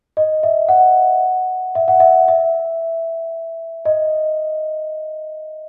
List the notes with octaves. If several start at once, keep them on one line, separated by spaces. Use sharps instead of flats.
D#5
E5
F#5
E5
F#5
E5
E5
D#5